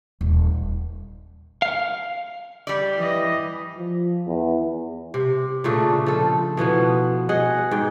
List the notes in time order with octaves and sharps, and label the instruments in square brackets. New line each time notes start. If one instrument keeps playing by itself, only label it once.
[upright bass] D#1
[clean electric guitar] F5
[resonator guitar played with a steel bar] G3 D5
[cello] E3 D#5
[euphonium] F3
E2
[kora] C3
A#2 C#3 A3 D4
F3 A4
B2 E3 F3 B3
G#4 D#5 F#5
G#2 G5